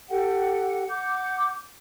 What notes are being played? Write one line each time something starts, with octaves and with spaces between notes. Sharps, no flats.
G4 A4 F#5 G5
F#5 D6 G6